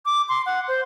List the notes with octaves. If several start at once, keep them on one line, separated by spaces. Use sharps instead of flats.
D6
C6
F#5
C5